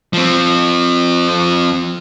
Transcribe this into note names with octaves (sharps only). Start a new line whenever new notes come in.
F3 C4